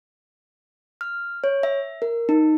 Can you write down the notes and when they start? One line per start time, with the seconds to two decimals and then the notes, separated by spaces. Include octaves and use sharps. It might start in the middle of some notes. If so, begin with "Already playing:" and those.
1.01 F6
1.44 C#5
1.63 E5
2.02 A#4
2.29 D#4